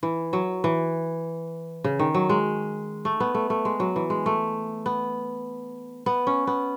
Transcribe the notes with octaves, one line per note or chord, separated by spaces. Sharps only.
E3
F#3
E3
C#3
D#3
F#3
G#3
A3
B3
A3
A3
G#3
F#3
E3
G#3
A3
B3
B3
C#4
B3